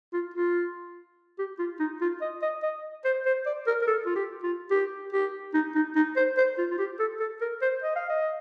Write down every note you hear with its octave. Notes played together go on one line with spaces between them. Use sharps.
F4
F4
G4
F4
D#4
F4
D#5
D#5
D#5
C5
C5
D5
A#4
A#4
A4
F4
G4
F4
G4
G4
D#4
D#4
D#4
C5
C5
F4
F4
G4
A4
A4
A#4
C5
D#5
F5
D#5